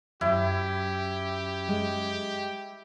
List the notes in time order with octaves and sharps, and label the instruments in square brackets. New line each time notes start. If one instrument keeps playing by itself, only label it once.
[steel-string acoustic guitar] F#2 [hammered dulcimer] E4 [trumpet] G4
[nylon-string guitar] G#3